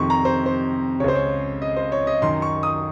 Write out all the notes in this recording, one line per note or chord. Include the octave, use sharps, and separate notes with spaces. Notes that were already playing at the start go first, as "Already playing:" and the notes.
Already playing: F2 C3 D#3 C6 C#6
A#5
C5
C5
C#2 C#3 C5 C#5
C#5
D#5
C5
C#5
D#5
F#2 D#3 C6
C#6
D#6